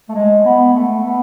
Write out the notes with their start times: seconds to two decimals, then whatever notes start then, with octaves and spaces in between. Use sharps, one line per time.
0.09 A3
0.15 G#3
0.45 B3
0.74 A3
1.04 B3